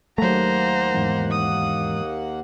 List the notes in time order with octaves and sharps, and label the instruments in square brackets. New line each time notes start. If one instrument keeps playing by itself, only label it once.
[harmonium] D#2 A#3 F#5 [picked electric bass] F#3 A3 [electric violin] C5 A#5
[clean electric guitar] E2 G#2
[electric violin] D#6